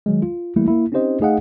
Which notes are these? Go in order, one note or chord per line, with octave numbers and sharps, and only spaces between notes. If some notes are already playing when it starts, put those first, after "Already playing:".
D#3 F#3 G#3
F4
E3 G3 A3 A#3 E4
A#3 E4
C4 C#4 D#4 G4 C5 D#5
A3 D#4 G#4 D#5 F5 F#5